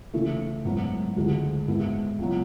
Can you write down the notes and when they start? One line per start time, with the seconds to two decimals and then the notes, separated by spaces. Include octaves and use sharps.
0.14 C#3 E3 A3
0.65 G#2 F#3 B3 E4
1.16 D2 C#3 E3 G#3
1.68 G#2 G#3 B3 E4
2.19 C#2 B2 F#3